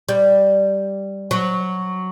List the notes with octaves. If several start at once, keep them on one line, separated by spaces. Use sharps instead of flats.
G3
F#3